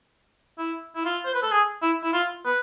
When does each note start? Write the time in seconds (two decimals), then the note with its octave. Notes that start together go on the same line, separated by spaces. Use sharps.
0.58 E4
0.95 E4
1.05 F4
1.25 C5
1.34 B4
1.42 A4
1.51 G#4
1.82 E4
2.03 E4
2.13 F4
2.45 B4